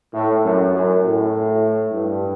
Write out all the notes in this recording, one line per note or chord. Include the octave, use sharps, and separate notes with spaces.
A2
F#2
F#2
A2
G2